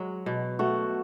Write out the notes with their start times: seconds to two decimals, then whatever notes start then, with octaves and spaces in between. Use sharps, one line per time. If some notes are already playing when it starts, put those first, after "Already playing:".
Already playing: F#3 G#3
0.26 B2
0.59 A3 F#4